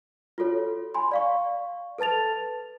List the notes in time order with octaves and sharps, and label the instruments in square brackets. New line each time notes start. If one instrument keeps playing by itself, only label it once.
[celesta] F4 F#4 A4 C#5
G#5 B5 C6
D5 F5 C#6
A4 B4 A5 A6 F7